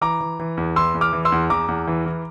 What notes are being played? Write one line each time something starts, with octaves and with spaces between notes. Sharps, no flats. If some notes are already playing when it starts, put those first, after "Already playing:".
E3 A#5 D6
E3
E3
E2
E3 C6 E6
E2
D6 F6
E3
C6 E6
E2
E2 A#5 D6
E2
E3
E3